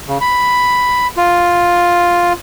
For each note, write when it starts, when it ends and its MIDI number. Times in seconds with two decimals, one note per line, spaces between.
0.08 0.18 49
0.21 1.07 83
1.17 2.33 65